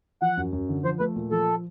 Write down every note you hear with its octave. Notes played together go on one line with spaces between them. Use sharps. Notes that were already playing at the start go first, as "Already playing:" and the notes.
F3 F#5
F#2
F#2
D3
F3 C5
A3 B4
A#2
F3 A4